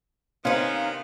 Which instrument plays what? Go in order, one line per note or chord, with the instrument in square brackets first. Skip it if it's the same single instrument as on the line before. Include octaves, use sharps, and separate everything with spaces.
[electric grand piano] C3 [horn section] D#3 B3 [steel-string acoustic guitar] C#4 D#4 [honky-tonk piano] C5 F5